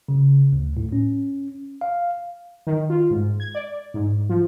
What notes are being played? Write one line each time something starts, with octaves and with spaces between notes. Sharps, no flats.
C#3
D2
A2
C#4
F5
D#3
F4
G#2
G#6
D5
G#2
F3